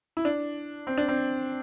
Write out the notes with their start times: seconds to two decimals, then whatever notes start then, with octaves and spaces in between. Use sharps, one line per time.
0.17 E4
0.25 D4
0.87 C4
0.98 D4
1.08 C4